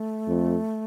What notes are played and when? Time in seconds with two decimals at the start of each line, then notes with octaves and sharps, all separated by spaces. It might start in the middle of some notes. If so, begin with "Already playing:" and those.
Already playing: A3
0.27 F2